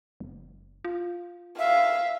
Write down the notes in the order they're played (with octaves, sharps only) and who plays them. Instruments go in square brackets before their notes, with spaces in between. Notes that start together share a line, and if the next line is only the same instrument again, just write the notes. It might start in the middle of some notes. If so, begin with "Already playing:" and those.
[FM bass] F#1
F4
[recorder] E5 [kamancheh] F5